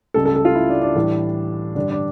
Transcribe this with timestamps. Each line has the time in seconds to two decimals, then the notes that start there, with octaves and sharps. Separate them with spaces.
0.14 C#2 C#3 G3 A4
0.25 A4
0.36 A4
0.45 F4
0.55 E4
0.69 D4
0.81 D4
0.95 A2 E3 G3
1.75 G2 D3 G3 D4
1.90 D4